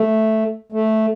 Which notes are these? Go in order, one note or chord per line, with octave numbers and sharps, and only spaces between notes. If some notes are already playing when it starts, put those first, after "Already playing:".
Already playing: A3
A3